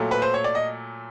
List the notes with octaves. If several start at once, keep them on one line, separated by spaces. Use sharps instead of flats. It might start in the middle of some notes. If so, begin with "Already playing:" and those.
Already playing: A#2 F#3 A3
B4
C5
C#5
D5
D#5